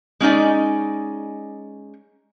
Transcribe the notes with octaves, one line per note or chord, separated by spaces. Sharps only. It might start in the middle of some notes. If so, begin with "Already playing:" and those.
G#3 C#4 D#4 D5